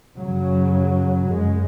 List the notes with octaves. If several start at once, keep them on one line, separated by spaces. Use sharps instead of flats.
F#2 C#3 F#3
F#2 C#3 G#3